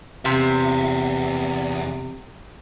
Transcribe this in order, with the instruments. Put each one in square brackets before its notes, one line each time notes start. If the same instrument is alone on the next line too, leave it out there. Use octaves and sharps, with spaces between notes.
[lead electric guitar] E2 E5 [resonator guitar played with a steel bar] C3